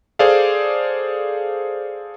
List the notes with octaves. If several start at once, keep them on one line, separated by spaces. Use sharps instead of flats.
G#4 A4 C5 D5 F5